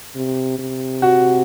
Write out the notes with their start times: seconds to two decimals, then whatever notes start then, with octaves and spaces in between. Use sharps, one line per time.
0.15 C3
0.59 C3
1.02 F#4